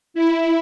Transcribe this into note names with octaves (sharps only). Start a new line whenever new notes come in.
E4